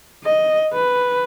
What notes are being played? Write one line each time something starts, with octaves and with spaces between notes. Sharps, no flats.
D#5
B4